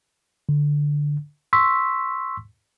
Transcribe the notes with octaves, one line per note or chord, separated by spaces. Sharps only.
D3
C6 C#6 E6 B6